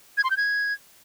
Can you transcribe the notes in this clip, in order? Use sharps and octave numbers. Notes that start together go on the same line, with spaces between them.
G#6
C6
G6
G#6